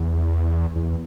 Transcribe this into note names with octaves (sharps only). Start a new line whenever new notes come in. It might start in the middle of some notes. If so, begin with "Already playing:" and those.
Already playing: E2
E2